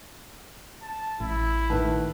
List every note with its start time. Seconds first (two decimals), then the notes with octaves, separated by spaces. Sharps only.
0.82 A5
1.20 A1 E4
1.70 A2 D#3 B4 A5